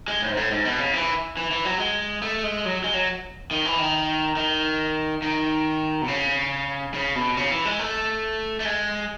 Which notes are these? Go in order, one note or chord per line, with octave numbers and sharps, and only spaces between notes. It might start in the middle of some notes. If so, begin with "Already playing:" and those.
G#3
A2
G#2
A2
G#2
B2
C#3
E3
E3
E3
F#3
G#3
A3
G#3
F#3
G#3
F#3
D#3
E3
D#3
D#3
D#3
B2
C#3
C#3
B2
C#3
E3
G#3
A3
A3
G#3